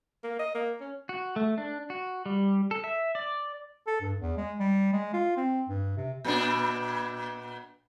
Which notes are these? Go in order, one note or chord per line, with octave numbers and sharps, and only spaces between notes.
A#3
D#5
A#3
C#4
F#4
A3
D4
F#4
G3
A4
E5
D5
A4
G2
E2
G#3
G3
G#3
F4
C4
G2
C3
A#2 B3 D4